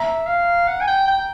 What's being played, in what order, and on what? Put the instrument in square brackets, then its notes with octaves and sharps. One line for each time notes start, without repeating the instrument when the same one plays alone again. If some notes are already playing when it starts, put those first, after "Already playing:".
Already playing: [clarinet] E5 [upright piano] A#5
[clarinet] F5
F#5
G#5
G5
G5